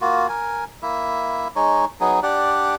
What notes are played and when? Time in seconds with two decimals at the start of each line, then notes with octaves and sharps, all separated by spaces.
0.01 A#3 F4 F#4
0.29 A#4 G#5
0.82 A#3 E4 E5
1.56 G#3 D#4 C#5
2.00 F#3 B3 D#4 G#4
2.23 D4 G4 D5 F#5